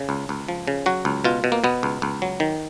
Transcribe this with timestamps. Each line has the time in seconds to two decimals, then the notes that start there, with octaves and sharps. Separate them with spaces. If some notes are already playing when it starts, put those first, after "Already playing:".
Already playing: C#3
0.09 C#2
0.29 C#2
0.48 F3
0.68 C#3
0.86 F#3 F#4
1.05 C#2
1.25 B2 F4
1.44 B2
1.52 A#3
1.64 B2 B3
1.83 C#2
2.02 C#2
2.22 F#3
2.40 D#3